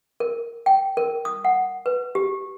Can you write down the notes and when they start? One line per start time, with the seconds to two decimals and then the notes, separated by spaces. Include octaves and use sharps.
0.20 A#4
0.66 G5
0.97 A#4
1.25 D#6
1.45 F#5
1.86 B4
2.15 G4